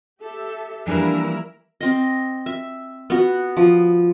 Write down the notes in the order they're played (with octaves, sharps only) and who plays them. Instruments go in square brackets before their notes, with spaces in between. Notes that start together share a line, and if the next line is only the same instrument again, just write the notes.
[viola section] G4 A4 E5
[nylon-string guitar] E3 F3 G3 [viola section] A#3 E4 A#4 [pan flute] D4
[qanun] C4 D#5
E5
B3 F#4
F3